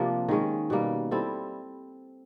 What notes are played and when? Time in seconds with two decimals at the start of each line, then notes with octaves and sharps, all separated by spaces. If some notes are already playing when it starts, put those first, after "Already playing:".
Already playing: C3 F3 A#3 D4
0.29 D#3 G#3 C#4
0.70 B2 G3 A#3
1.11 G3 C4 E4 A4